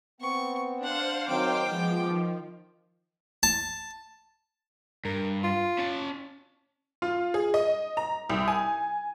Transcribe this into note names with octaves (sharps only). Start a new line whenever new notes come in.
B3 C4 C#6
D4 C5 F5 F#5
D#3 F#3 C4 G5 D6
F3 G#3 B3
D#3
A5
G2 A#4
F4
C#4 A5
F4
G#4
D#5
A#5
C2
G#5